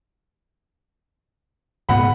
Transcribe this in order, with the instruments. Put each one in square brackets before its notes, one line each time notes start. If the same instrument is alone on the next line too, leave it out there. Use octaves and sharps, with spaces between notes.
[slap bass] F#1 G#2 B3 [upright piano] F#5 B5